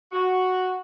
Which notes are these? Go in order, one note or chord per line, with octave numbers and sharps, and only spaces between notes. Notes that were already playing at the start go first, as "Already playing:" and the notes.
F#4